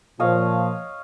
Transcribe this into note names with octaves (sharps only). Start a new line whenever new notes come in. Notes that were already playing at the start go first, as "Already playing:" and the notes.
A#2 F3 C#5 D#5 F5